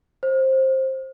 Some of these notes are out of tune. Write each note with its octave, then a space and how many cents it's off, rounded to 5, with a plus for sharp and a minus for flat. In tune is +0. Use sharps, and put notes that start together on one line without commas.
C5 +15